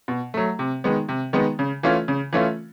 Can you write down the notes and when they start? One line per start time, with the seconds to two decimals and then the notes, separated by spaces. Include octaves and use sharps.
0.08 B2
0.34 F#3 A3
0.59 C3
0.84 D#3 G#3 B3
1.09 C3
1.33 D#3 G#3 B3
1.59 C#3
1.83 E3 A3 C#4 F4
2.08 C#3
2.33 E3 A3 C#4 F4